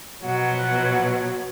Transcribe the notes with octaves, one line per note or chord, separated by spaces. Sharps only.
B2 F3 F#3 F#5